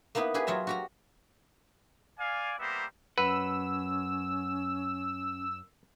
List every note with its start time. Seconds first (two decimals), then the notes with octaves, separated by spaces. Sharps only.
0.15 A#3 B3 D#4 E4 B4
0.34 E4 G4 G#4 B4
0.47 F#3 F4 E5 A#5
0.67 F#4 G4 A#5
2.19 D5 F5 G#5
2.59 G3 A#3 B3 C5 E5 A#5
3.18 F#2 C#4 B4 F#5 E6